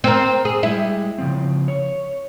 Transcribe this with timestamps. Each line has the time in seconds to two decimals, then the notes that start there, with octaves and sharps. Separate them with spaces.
0.04 C4 A#4
0.45 G#4
0.63 G3 G#3 E4
1.18 C#3 F3 C4
1.68 C#5